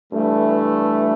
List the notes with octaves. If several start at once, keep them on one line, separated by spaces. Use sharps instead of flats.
G2 E3 A3